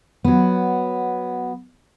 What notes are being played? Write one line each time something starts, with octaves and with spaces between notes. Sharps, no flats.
F#3 B3